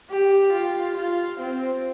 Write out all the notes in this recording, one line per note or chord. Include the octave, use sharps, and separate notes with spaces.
G4
F4
F4
C4